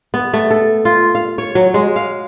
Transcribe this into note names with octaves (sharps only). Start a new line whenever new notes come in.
B3
A3
A4
F4
F5
C#5
F#3
G#3
F5